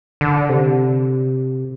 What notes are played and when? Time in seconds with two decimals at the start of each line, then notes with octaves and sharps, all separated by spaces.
0.21 D3
0.49 C3